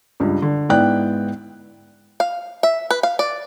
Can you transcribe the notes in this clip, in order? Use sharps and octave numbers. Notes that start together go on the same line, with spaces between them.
C#2 G2
D3
G#2 B3 E4 D5 G5 F#6
F5
E5
B4
F5
D5